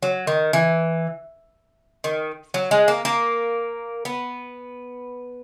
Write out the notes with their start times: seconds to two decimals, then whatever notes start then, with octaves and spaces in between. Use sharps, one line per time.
0.03 F#3
0.27 D#3
0.53 E3
2.04 D#3
2.54 F#3
2.71 G#3
2.88 A#3
3.05 A#3
4.05 B3